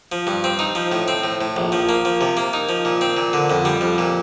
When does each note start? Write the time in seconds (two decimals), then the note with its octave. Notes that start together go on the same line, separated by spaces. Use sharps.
0.12 F3
0.27 G2
0.44 C4
0.59 D#4
0.75 F3
0.92 A2
1.08 C4
1.24 A2
1.41 A2
1.56 A#1
1.72 F3
1.89 A#3
2.05 F3
2.21 C3
2.37 A#3
2.53 D#4
2.69 F3
2.85 A#2
3.01 C4
3.17 A#2
3.33 D3
3.50 F2
3.65 G3
3.81 F2
3.98 A#2